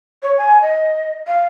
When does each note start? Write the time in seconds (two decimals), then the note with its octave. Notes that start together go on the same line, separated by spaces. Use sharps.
0.23 C#5
0.38 G#5
0.62 D#5
1.27 F5